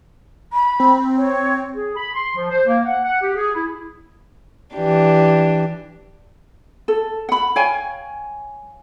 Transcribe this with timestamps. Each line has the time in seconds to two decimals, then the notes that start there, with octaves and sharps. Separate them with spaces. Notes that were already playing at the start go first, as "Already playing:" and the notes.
0.53 B5
0.80 C4
1.17 C#5
1.74 G#4
1.96 B5
2.14 C6
2.35 F3
2.50 C5
2.66 A#3
2.85 F#5
3.04 F#5
3.22 G4
3.36 G#4
3.54 E4
4.74 E3 D4 G4
6.88 A4
7.29 F#5 B5
7.56 C#5 F5 G5 G#5